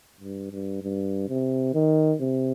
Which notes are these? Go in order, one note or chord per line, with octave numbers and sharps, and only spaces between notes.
G2
G2
G2
C3
D#3
C3